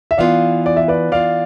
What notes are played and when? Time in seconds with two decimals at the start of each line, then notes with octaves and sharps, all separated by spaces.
0.11 E5
0.18 E3 B3 F4 D5 F5
0.66 D5
0.77 E5
0.88 B4 D5
1.12 E3 B3 F4 D5 F5